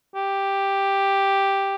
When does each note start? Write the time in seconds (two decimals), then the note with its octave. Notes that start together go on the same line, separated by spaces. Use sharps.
0.15 G4